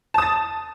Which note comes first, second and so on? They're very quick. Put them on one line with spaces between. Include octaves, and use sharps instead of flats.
A5 D#6 A6